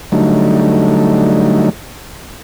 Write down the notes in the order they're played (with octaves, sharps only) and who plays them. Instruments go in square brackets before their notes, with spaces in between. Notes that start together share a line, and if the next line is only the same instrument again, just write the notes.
[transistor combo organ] D3 F#3 G3 A3 D#4